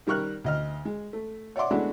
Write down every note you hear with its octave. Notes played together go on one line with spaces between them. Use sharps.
D#3 G3 A#4 C#6 F6 F#6
D2 D#5 F6
G#3
A3
C#5 D5 E5 F#5 C6 D6
G#3 A3 B3 D4 E4 F#4